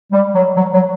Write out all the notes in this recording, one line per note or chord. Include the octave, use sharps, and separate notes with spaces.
G3
F#3
F#3
F#3